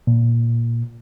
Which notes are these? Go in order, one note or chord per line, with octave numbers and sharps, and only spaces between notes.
A#2